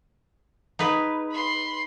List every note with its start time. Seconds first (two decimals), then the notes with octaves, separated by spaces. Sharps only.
0.79 D#4 G#4 B4
1.31 B5 C6